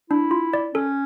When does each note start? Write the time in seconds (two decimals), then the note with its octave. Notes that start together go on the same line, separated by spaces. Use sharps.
0.10 D4 E4
0.31 F4
0.53 D5
0.74 C#4 A4